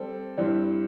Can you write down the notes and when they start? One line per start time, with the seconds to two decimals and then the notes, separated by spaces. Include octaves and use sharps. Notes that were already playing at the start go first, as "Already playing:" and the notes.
Already playing: G3 C4 A4
0.37 G2 G3 C4 E4 C5